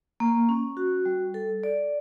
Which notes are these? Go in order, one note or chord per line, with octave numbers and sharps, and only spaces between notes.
A#3
C#4
F#4
G3
A4
D5